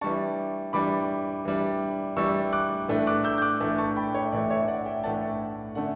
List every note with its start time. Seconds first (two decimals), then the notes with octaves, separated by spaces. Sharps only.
0.01 E3 G3 D4 A5 C#6
0.73 E3 G3 D4 B5 D6
1.45 E3 G3 D4
2.17 E3 G3 D4 C#6 E6
2.53 D6 F#6
2.88 A2 E3 A3 D4
3.07 D6 F#6
3.24 E6 G6
3.38 G6
3.42 D6 F#6
3.60 A2 E3 A3 D4
3.78 A5 C#6
3.96 G5 B5
4.15 C#5
4.32 A2 E3 A3 D4 D5
4.51 C#5 E5
4.68 D5 F#5
4.86 E5 G5
5.04 A2 E3 A3 D4 F#5 A5
5.75 D3 A3 C#4 D5 F#5